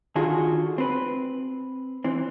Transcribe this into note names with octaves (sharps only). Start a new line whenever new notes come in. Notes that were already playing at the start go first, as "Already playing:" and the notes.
D3 D#3 F4 F#4 G#4
C4 B4
E3 C4